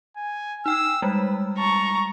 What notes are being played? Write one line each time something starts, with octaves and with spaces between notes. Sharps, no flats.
G#5
D#4 G5 E6 F6
G3 G#3 B4
A5 A#5 C#6